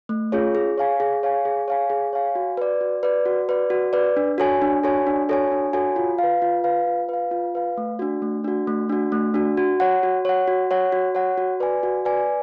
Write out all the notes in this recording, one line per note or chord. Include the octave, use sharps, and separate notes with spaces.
A3
C#4 F4 G#4 C#5
G#4
C#5 F5 G#5
G#4
C#5 F5 G#5
G#4
C#5 F5 G#5
G#4
C#5 F5 G#5
F#4
B4 D5
F#4
B4 D5
F#4
B4 D5
F#4
B4 D5
D4
F#4 A4 C#5 G#5
D4
F#4 A4 C#5 G#5
D4
F#4 A4 C#5 G#5
D4
F#4 A4 C#5 G#5
F4
B4 F5
F4
B4 F5
F4
B4 F5
F4
B4 F5
A3
D4 F#4
A3
D4 F#4
A3
D4 F#4
A3
D4 F#4
F#4
C#5 F#5
F#4
C#5 F#5
F#4
C#5 F#5
F#4
C#5 F#5
F#4
B4 D5 G#5
F#4
B4 D5 G#5